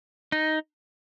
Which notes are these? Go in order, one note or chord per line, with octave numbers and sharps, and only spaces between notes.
D#4